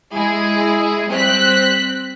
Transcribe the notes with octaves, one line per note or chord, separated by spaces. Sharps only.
G#3 E4 G#4
G3 C4 F#6 B6